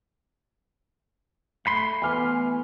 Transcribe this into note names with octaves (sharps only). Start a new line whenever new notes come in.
A3 B5 C6
E3 B3 G#5 D6 F6